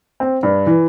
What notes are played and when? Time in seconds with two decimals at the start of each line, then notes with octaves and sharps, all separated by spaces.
0.20 C4
0.43 G2
0.67 E3